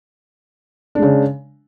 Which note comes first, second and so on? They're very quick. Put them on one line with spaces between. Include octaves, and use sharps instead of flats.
D4 G#3 C#3